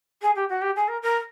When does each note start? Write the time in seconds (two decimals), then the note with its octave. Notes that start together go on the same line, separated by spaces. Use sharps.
0.22 G#4
0.35 G4
0.49 F#4
0.61 G4
0.76 G#4
0.88 A#4
1.02 A#4